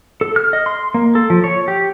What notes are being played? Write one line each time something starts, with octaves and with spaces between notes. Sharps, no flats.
A4
F6
D#5
C6
A#3
A4
F3
C#5
G4